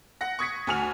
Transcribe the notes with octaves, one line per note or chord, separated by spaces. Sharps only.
F#5 A#6
C#6 D#6 G#6 A#6 B6 C#7
D2 F#4 G#5 F6 F7